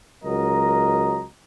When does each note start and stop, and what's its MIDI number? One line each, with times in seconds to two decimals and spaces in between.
0.24 1.24 37
0.24 1.24 54
0.24 1.24 70
0.24 1.24 75
0.24 1.24 82